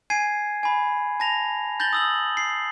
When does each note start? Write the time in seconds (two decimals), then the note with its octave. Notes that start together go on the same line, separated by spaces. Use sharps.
0.10 G#5 G#6 C7 D#7
0.63 G#5 B5
1.20 A5 A#6 F7
1.80 G6 A6 A#6 F#7 G7
1.93 D#6 E6 F#7
2.37 C7